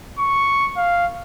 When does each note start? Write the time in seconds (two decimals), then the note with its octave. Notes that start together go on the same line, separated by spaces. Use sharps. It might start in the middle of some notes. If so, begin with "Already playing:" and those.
0.19 C#6
0.77 F5